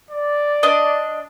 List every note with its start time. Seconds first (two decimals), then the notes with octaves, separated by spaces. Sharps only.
0.11 D5
0.63 D4 D#5